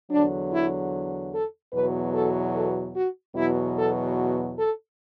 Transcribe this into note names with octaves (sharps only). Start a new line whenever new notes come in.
E2 D3 F#3 D4
E4
A4
E2 B2 F#3 B4
A4
A4
F#4
E2 B2 F#3 E4
A4
A4